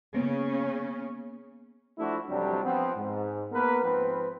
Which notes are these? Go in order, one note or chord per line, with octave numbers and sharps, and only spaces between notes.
C#3 A#3 B3 C#4
F3 A3 D4 E4 F#4
A1 F2 C3 F#3 G3 D4
F3 B3 C4
G#2
A#3 B3 A#4 B4
G#2 F3 C4 B4